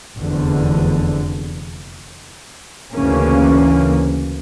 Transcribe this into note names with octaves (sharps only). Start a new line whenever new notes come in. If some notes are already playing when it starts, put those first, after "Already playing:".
F1 E2 D3
D2 C#3 E3 A#3 C#4